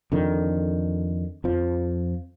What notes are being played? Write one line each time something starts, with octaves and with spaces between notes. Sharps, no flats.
F2 D3 D#3
F2 F3